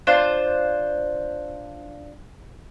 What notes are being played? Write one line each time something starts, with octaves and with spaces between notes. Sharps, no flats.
D4 F4 C5